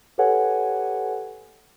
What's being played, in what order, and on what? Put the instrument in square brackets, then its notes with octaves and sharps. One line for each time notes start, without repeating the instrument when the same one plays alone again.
[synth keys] G4 A4 B4 C#5 F#5 G#5